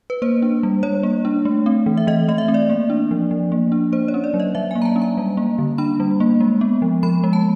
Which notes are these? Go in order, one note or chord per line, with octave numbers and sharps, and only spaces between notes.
B4
A#3 C5
D4
G3
G3 C#5
A#3
D4
A3
C4
E3
E5
E3 D#5
A3 D#5
E5
C4
D5
A#3
D4
F3
F3
A#3
D4
A#3 C5
C#5
C#4
D5
F#3
D#5
F#3 E5
A#3 G#5
A#5
A5
C#4
A#5
G3
A#3
D3
D4 B5
G3
A#3
G#3
B3
F3
F3 B5
G#3
A5